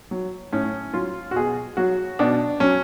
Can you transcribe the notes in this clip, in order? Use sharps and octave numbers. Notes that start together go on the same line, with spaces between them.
F#3
A2 C#4
F#3 F4
F#4
B2 G#4
F#3 F#4
B2 D4
F#3 C#4